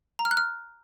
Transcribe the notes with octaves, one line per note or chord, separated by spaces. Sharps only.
A#5
F6
F#6
F6